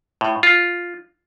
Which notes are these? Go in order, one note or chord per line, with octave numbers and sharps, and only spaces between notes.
A2
F4